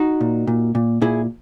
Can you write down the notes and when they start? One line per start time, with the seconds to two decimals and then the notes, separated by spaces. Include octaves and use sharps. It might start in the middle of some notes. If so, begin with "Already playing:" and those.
Already playing: D#4 F#4
0.21 A#2
0.47 A#2
0.75 A#2
1.01 A#2 E4 G#4